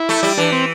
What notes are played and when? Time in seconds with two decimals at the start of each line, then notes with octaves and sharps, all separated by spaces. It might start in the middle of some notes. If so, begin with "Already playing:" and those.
Already playing: E4
0.09 A3
0.23 G3
0.37 E3 D4
0.52 C4